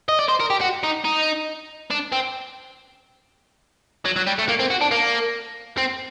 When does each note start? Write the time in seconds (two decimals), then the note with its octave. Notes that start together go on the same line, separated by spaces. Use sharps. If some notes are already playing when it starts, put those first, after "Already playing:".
0.09 D#5
0.19 D5
0.28 C5
0.40 A#4
0.50 G4
0.61 F#4
0.83 D#4
1.04 D#4
1.91 D4
2.12 C4
4.05 F#3
4.16 F#3
4.27 G3
4.39 A3
4.48 A#3
4.59 C4
4.71 F#4
4.81 D4
4.91 A#3
5.78 C4